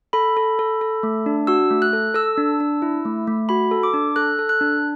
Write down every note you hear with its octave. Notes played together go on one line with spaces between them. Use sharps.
A4 B5
A4
A4
A4
A3
D4
F#4 E6
A3
F#6
A4
A4 E6
D4
D4
E4
A3
A3
F#4 B5
A4
D6
D4
A4 F#6
A4
F#6
D4